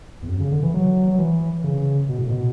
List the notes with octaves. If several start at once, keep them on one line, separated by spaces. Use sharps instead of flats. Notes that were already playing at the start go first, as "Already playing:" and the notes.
E2
F#2
C#3
D3
E3
F#3
F#3
E3
C#3
B2
A2
B2